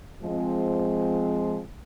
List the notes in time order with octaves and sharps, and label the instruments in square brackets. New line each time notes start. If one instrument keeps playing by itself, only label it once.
[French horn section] F3 G#3 C4